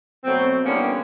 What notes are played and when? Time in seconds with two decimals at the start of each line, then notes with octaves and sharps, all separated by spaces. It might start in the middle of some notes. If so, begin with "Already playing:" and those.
0.24 B2 F#3 A3 C4
0.65 D3 E3 G3 A#3 B3 C#4